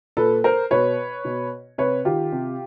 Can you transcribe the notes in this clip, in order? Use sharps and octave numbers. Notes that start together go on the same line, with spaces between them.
A#2 A4 B4
A#4 C5
B2 B4 C#5
B2
C3 B4 C#5
D#3 F4 G4
C3